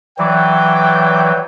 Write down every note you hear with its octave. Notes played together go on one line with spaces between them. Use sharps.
E3 F#3 D5 G5